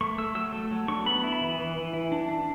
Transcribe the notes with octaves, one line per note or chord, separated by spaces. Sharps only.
A3 C#6
A3 E6
F#3 E6
A3
F#3
D4 C#6
B3 B5
E4
B5
E3
E3
E3
E4
D4
D4